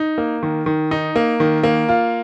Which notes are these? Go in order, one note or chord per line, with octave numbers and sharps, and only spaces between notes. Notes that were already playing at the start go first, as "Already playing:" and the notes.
Already playing: D#4
A#3
D#3
D#3
D#4
A#3
D#3
A#3
F4